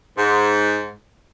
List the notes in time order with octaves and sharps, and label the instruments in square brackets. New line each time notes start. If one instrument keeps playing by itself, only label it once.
[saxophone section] G#2